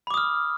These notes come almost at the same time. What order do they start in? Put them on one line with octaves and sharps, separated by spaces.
B5 D6 D#6 F6